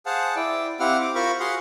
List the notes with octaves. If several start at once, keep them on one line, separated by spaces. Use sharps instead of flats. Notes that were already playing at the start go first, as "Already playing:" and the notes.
G#4 C5 F5 F#5 A5
E4 D5 G5
C4 E4 G4 F5 F#5 F6
D6
F4 A#4 C5 B5 C#6
F#4 G#4 F5 F#5 C6